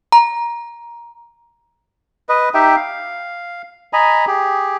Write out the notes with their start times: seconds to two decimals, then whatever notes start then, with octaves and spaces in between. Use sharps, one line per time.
0.12 A#5
2.29 B4 D#5
2.54 D#4 G4 E5 G5
2.76 F5
3.93 D#5 G#5 A#5 B5
4.27 G4 G#4